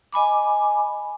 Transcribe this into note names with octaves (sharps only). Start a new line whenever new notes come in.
D#5 G#5 B5 D6